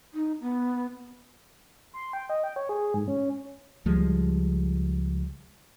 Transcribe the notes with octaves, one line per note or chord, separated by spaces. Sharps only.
D#4
B3
C6
G5
D#5
G5
C#5
G#4
G#2
C#4
C#2 F3 G3 G#3